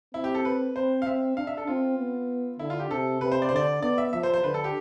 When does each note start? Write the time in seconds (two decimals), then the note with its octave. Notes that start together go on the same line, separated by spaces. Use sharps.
0.14 C4 E4
0.24 G4
0.35 A4
0.45 B4
0.76 C4 C5
1.02 F5
1.06 C4 E5
1.37 D4 F5
1.47 E5
1.57 A4
1.67 C4 F4
1.98 B3
2.59 D3 E4
2.70 F4
2.80 G4
2.90 C3 A4
3.21 C3 B4
3.32 C5
3.42 D5
3.49 C5
3.52 D3 D5
3.82 B3 D5
3.98 E5
4.13 F3 E5
4.23 C5
4.34 C5
4.44 D3 B4
4.54 A4
4.64 G4